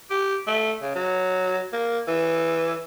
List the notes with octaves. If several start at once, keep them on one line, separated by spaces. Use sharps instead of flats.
G4
A3
C#3
F#3
A#3
E3